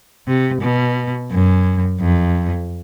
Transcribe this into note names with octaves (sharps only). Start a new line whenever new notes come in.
C3
B2
F#2
F2